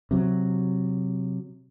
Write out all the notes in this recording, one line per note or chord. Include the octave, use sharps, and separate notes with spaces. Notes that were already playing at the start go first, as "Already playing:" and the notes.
C3 F#3